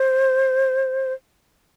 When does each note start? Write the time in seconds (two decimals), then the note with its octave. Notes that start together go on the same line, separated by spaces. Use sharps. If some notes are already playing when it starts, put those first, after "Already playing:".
Already playing: C5